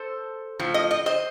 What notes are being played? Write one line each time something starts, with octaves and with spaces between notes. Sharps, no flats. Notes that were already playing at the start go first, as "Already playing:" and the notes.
Already playing: A4 C5
A2 F3
D#5
D#5
C5 D#5